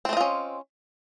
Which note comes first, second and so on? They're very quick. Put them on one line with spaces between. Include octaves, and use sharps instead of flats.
C4 A3 D#5 F4 C#4